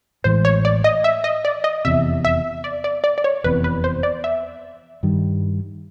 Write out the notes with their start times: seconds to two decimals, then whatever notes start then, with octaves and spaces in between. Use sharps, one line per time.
0.24 A1 A2 E3 G#3 C5
0.45 C#5
0.65 D5
0.84 D#5
1.04 E5
1.24 D#5
1.45 D5
1.64 D#5
1.85 F1 E2 C3 E5
2.25 E5
2.64 D5
2.84 D5
3.04 D5
3.18 D5
3.24 C#5
3.44 F1 E2 C3 B4
3.64 B4
3.84 C5
4.03 D5
4.24 E5
5.03 G2 D#3 G3